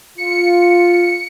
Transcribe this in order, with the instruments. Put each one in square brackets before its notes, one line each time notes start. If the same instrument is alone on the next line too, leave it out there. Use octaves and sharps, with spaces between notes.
[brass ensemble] F4 [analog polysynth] C#7